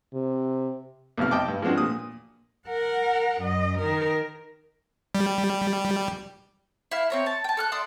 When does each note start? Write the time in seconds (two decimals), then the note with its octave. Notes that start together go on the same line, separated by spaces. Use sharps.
0.14 C3
1.17 B1 F2 C3 F6
1.31 D#5 G5 A5 D6
1.48 G2
1.62 F3 G#3 C4 D4 F#4
1.78 A#2 D#6
2.68 A#4 F#5
3.42 F#2 D#5
3.78 D#3 A#4
5.15 G3
6.91 E4 F5
7.10 C4 C#5 A#5
7.26 A5
7.44 G5 A5
7.57 A4 F6 F#6
7.72 D5 E5 C6 D#6